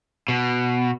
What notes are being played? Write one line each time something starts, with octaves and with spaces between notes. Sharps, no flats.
B2